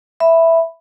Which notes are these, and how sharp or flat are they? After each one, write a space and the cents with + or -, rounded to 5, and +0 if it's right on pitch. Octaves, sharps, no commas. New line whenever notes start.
E5 +0 B5 +0